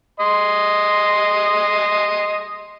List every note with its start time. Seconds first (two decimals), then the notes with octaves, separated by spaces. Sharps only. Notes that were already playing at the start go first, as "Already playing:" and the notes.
0.20 D#5 C6